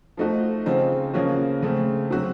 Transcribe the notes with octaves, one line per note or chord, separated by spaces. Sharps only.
F3 A3 D#4 F#4
C#3 F3 C4 D#4
C#3 F3 A#3 C#4 F#4
C#3 A3 C4
C3 F#3 C4 F#4